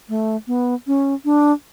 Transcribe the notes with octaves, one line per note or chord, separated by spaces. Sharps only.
A3
B3
C#4
D4